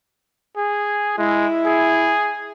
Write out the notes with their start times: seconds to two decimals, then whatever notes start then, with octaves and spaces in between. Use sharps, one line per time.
0.57 G#4
1.18 G#3 E4
1.66 G#4